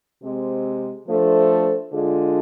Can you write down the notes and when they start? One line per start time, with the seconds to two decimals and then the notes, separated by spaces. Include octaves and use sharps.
0.23 C3 G#3 C4
1.08 F3 A3 D4 A4 C5
1.92 D3 G#3 D4 F4 G#4